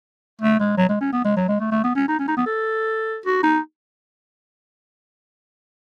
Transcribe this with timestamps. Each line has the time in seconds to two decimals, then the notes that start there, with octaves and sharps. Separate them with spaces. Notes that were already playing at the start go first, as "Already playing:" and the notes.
0.42 A3
0.59 G#3
0.77 F#3
0.89 G#3
1.01 C#4
1.12 B3
1.24 G#3
1.36 F#3
1.48 G#3
1.60 A3
1.71 A3
1.84 B3
1.95 C#4
2.08 D#4
2.19 C#4
2.28 D#4
2.37 B3
2.46 A4
3.26 F#4
3.43 D#4